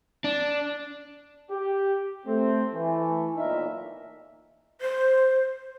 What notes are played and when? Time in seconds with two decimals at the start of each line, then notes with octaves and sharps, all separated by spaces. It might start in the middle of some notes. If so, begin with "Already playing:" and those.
0.24 D4
1.51 G4
2.26 A3 C4
2.74 E3 A3
3.36 B1 A#2 D#4 A#4 E5
4.81 C5